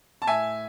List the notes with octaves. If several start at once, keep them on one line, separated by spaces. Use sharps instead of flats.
A5
A2 E5 G#5